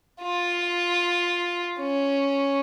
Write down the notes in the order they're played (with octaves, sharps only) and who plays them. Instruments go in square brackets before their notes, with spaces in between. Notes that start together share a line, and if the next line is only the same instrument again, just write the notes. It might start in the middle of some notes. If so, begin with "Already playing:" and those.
[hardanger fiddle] F4
C#4